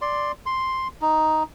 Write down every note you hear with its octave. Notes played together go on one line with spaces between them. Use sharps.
D5 C6
C6
D#4